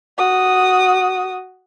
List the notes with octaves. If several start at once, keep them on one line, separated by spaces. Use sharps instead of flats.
F#4 D#6